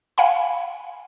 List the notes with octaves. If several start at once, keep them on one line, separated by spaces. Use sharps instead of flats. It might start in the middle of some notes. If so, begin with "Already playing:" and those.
F5 F#5 G#5 B5